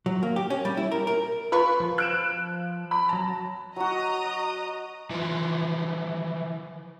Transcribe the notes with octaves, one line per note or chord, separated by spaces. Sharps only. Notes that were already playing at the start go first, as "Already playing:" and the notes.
F#3
A#3
G4
C#4
G3
E4
A#4
A#4
F4 B4 B5 C#6
F3
F#6 D7 E7
B5
F#3 A5 A#5
F#3 F#4 D#5 A#5 D#6
E3 F3